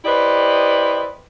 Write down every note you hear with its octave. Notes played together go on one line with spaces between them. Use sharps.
E4 G4 B4 C5 D5 D#5